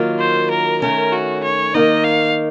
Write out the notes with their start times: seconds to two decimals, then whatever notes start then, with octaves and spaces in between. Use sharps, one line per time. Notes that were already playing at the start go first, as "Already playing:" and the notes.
Already playing: D#3 F#3 A#3 F4
0.20 C5
0.51 A#4
0.82 D#3 A3 C#4 A#4
1.12 F#4
1.44 C#5
1.74 D#3 A#3 D#4 D#5
2.04 F5